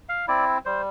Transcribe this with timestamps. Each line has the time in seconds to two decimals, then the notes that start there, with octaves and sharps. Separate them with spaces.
0.09 F5
0.28 C4 E4 D5
0.65 G3 C5